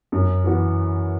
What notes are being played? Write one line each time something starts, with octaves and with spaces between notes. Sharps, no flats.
F#2
E3 B3 F#4